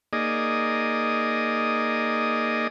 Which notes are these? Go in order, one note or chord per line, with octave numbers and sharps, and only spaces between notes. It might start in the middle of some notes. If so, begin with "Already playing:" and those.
A#3 D#4 G#4 D5 D#5